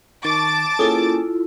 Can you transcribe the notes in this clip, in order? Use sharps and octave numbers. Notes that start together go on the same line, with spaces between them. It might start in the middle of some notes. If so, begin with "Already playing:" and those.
D#3 A5 C#6 D6 A6
A#3 C#4 E4 F4 G#4 A4